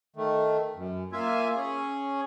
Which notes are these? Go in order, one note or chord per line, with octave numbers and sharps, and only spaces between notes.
D#3 A3
F#2
A#3 F4 E5 G#5
C#4 G#4